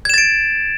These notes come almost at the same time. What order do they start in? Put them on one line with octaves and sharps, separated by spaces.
G#6 E7 A6 D7